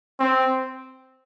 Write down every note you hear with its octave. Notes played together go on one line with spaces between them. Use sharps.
C4